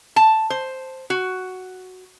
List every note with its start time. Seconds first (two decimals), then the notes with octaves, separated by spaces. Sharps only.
0.16 A5
0.50 C5
1.10 F#4